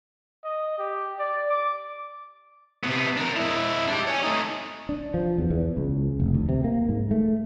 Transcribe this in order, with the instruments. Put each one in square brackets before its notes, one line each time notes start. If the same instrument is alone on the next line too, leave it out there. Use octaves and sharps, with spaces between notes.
[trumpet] D#5
G4
D5
D6
[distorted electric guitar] C3 B3
D4 A#4
G#3 E4
D4 G4
C#5 G#5
A3 D#4
[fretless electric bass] D4
F3
E2
E2
C#2
F1
D2
C3
A#3
G#2
A3